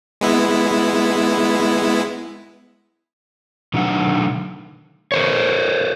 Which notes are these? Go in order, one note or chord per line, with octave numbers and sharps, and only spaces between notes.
G#3 B3 E4
B2 D3 D#3 F#3 A3 F#5
A#4 C5 C#5